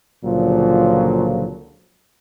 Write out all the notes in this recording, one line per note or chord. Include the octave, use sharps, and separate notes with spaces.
C#2 A#2 D3 F3 F#3